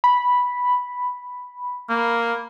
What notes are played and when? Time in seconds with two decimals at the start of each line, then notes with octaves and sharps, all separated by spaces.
0.04 B5
1.89 A#3